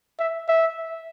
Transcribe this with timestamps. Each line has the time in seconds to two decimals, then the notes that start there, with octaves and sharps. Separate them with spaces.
0.19 E5
0.49 E5